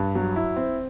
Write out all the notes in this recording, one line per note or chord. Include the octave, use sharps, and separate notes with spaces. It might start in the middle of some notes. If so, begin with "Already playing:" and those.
Already playing: G2
F#3
E4
C4